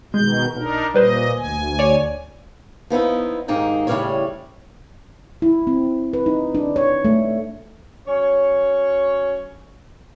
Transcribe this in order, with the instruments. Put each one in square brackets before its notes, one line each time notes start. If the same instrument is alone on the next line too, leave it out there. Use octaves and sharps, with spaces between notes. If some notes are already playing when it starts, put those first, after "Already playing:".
[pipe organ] B2 D#3 G6 [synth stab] G#3
[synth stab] B1 [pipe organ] D4 D#4 A#4
[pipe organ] A#2 D#5 [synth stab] G3 B4 C5
[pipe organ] D2 G#5
[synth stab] C#5 D5
[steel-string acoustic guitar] F3 B3 D#4 E4
D#2 G#2 A#3 D#4 G#4 G5
A2 C#3 G3 A#3 C#4 C#5
[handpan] E4
C4
B4
D#4
D4
C#5
A3
[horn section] F#3 C#4 C#5